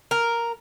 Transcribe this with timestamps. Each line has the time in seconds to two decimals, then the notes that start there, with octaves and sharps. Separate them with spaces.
0.11 A#4